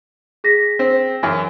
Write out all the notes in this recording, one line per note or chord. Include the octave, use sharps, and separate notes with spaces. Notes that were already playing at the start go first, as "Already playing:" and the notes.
G#4 A#6 B6
C4
F#2 E3